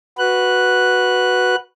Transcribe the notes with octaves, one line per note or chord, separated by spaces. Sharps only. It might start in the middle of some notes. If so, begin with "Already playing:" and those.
F#4 B4 F#6